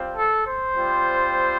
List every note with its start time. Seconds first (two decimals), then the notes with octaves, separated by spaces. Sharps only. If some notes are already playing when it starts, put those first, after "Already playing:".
Already playing: G3 C4 F4
0.15 A4
0.45 C5
0.73 G3 C4 F4